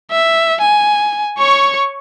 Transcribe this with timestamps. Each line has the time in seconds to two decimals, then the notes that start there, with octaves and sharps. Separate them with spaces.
0.11 E5
0.61 G#5
1.38 C#5 C#6